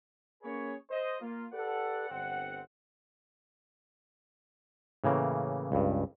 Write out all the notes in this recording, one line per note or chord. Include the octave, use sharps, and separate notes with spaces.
A#3 C#4 G#4 B4 C#5
C5 D#5
A#3 F4
G4 A4 B4 D5 F#5
G1 C4 F#5
A2 C#3 E3 A#3
C#2 G2